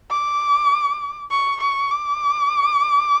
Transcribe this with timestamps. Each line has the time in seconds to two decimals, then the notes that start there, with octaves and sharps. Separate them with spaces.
0.11 D6
1.30 C#6
1.61 C#6
1.90 D6